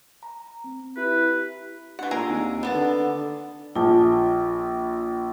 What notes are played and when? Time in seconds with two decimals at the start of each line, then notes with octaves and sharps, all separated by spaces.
0.23 A#5
0.64 C4
0.97 E4 G4 B4
1.99 E3 D4 G4 F#5
2.11 A#2 G#4 A#5 E6 D7
2.29 D#2 C4
2.63 B3 D4 B4 F#5 A5
2.74 D3
3.76 A#1 F4 A5